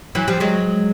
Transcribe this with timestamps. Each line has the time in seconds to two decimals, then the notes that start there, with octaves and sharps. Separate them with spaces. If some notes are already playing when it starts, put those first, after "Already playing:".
0.15 E3 F#3
0.28 F3 G3
0.40 F#3 G#3